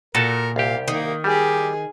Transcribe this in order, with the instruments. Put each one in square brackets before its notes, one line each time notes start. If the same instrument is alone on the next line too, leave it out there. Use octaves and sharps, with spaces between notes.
[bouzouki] A#2 [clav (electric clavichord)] F#4 A4 A5 [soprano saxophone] A#4
[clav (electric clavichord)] C2 G4 [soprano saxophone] F5
[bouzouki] D#3 [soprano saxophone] A#3
[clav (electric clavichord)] G3 [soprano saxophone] G4 [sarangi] G#4